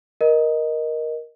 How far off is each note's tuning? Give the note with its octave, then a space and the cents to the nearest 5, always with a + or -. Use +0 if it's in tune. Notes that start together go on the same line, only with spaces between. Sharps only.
A#4 +10 D#5 +0